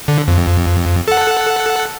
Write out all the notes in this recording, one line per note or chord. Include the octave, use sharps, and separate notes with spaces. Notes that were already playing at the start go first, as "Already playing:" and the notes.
D3
F2
A4 F#5